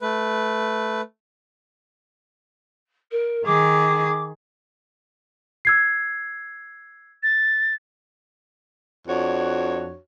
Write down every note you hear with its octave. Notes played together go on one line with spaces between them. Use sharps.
A3 B4
A#4
D#3 G#4 D6
E6 G#6 C7
A6
F2 D4 F#4 C#5